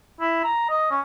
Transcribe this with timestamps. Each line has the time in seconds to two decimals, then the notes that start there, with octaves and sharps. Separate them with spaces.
0.20 E4
0.44 A#5
0.69 D#5
0.91 C#4